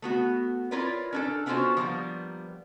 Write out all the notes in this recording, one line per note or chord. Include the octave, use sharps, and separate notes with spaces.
A3 B3 F#4
E4 F4 A#4 B4 C#5 D5
C#4 D4 A4
B3 C#4 D4 F4 F#4 C5
F3 G3 A#3 B3